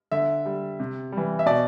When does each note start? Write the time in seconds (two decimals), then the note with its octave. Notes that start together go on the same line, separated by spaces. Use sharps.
0.12 D3 E5
0.46 G3
0.80 C3
1.12 E3 G3
1.39 E5
1.46 B2 D5